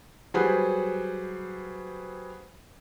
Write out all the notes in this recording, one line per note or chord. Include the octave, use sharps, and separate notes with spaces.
F#3 G3 G#4 B4 C5